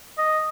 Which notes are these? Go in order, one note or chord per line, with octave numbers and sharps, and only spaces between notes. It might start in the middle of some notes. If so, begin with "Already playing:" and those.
D#5